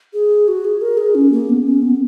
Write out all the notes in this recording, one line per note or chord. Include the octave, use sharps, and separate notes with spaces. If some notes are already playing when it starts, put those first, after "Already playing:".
G#4
F#4
G#4
A#4
G#4
C#4
A#3
B3
C#4
B3